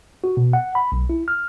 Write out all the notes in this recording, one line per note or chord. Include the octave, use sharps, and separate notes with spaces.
F#4
B2
F#5
B5
B1
E4
F6